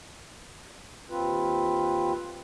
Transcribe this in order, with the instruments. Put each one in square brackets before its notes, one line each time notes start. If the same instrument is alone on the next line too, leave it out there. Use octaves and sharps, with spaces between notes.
[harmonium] D#2 C4 F4 B4